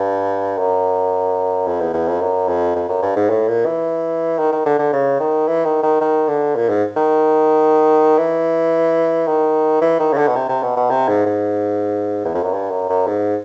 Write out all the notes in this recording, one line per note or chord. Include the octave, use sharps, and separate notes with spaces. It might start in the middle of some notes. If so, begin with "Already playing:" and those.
Already playing: G2
F#2
F2
E2
E2
F2
F#2
F2
F2
F#2
G2
G#2
A2
A#2
E3
D#3
D#3
D3
D3
C#3
D#3
E3
D#3
D#3
D#3
D3
A#2
G#2
D#3
E3
D#3
E3
D#3
C#3
D3
B2
C3
C3
B2
B2
C3
G#2
G#2
E2
F2
F#2
G2
F#2
F#2
G#2